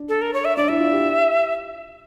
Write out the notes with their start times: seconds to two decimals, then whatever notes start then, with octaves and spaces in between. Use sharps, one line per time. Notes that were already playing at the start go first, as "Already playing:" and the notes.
Already playing: D4
0.09 A4
0.22 A#4
0.34 C#5
0.45 E5
0.57 D4 D5
0.68 E4 E5
0.80 F4
0.92 G4